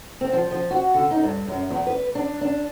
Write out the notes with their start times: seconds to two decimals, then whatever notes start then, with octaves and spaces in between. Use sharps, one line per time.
0.21 C4
0.33 F3
0.51 F3
0.71 F#4
0.94 D3
1.11 D#4
1.23 G2
1.48 F#2
1.70 E2
1.87 B4
2.15 D4
2.41 D4